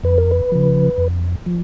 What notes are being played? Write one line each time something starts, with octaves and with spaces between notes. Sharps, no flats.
F2 B4
A#4
B4
C#3 F3
F2
F3